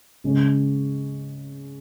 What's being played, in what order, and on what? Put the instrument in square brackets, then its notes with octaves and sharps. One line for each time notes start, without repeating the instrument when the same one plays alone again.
[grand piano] C#3 G#3 C#4